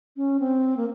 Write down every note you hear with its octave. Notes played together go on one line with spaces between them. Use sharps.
C#4
C4
A#3